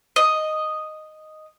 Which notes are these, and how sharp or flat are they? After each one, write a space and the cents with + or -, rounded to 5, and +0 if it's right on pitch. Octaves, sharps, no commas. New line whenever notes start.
D#5 -5